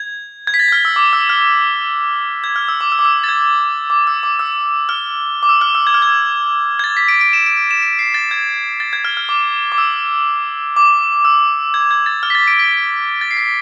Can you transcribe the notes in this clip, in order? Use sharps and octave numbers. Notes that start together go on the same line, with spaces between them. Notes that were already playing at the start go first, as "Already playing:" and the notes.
Already playing: G#6
G#6
B6
A6
G#6
F6
E6
D6
E6
F6
G#6
F6
E6
D6
E6
D6
E6
A6
G#6
D6
E6
D6
E6
F6
D6
E6
F6
E6
G#6
F6
G#6
G#6
A6
B6
D7
D7
E7
D7
E7
D7
C7
A6
G#6
A6
G#6
F6
F6
D6
D6
E6
D6
E6
G#6
G#6
A6
F6
B6
A6
D7
B6
A6
C7
B6